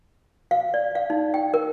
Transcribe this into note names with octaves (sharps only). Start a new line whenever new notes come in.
F5
D5
F5
D#4
G5
A#4